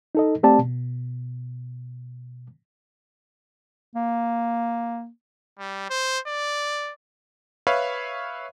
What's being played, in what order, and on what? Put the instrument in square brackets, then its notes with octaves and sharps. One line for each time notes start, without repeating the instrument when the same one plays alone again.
[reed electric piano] D#4 A4 D#5
A3 C4 G4 D5 A5
B2
[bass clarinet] A#3
[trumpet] G3
C5
D5
[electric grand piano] B4 C#5 E5 F5 B5